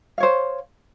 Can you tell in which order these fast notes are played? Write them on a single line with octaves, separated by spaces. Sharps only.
F5 C#5 C5